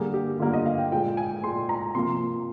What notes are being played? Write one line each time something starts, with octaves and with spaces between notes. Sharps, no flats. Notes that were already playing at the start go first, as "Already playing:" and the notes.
Already playing: D3 G3 A#3 G#4
G4
D3 G3 A#3 F4
D#5
F5
G5
A#2 G#3 G5
G#5
A#2 G#3 C6
A#5
C3 F3 A#3 C6